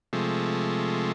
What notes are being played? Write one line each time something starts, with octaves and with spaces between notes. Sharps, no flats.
C3 F3 G#3 A3